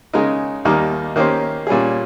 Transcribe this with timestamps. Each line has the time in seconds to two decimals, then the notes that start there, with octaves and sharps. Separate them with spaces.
0.14 C#3 G#3 D#4 A#4
0.65 D#2 D#3 G3 A#3 D#4
1.16 D#3 A#3 C#4 G4 C5
1.67 A#2 G3 C#4 G#4